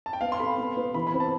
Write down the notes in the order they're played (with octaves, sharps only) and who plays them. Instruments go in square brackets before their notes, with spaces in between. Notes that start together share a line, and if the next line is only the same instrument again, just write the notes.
[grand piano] A5
G5
[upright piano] B3 [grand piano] F5
[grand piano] C6
[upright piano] A4 [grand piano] B5
[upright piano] B3
B3
[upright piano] E3 [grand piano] B5
[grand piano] B5
[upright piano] C4
[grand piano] A5